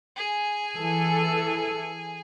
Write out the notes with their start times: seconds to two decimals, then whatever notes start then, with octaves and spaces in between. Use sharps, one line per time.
0.17 G#4 G#5
0.76 E3 A4